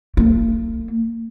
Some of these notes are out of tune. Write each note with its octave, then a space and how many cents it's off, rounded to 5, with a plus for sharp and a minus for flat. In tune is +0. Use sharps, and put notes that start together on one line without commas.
A#3 -35